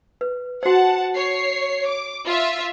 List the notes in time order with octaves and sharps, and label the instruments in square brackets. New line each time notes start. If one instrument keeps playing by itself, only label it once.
[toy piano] B4
[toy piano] F#4 C5 [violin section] F#5 A5
[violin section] C#5 C7
D6
F4 E5